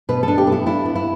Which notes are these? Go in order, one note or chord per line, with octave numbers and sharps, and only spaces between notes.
B2 B4
A4
D4
G4
B3
E4
D4 E4
B3
E4